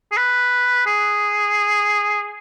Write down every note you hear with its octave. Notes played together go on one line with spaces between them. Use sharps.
G#4
B4
G#4